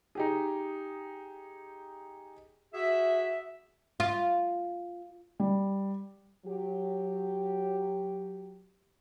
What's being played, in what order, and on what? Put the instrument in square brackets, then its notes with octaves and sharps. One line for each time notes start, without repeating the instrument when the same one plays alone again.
[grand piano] D#4 G4 G#4
[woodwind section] F#4 G#4 E5
[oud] F4
[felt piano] G3
[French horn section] F#3 G4